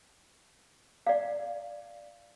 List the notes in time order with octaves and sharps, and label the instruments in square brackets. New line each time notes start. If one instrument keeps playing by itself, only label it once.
[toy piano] D5 F5